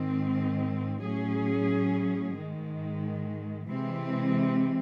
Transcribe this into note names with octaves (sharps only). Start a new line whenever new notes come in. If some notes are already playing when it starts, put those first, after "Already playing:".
Already playing: G#2 D#3 G#3 C4
A2 F#3 C#4 G#4
G#2 D#3 G#3
C3 E3 G#3 C4